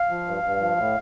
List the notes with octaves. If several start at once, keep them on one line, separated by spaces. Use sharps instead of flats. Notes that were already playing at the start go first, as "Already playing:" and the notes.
Already playing: F5
F3
G2
G2
F3
A2